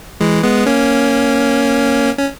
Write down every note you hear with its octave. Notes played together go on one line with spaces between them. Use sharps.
E3 G#3
G#3 B3
A#3 C#4
C#4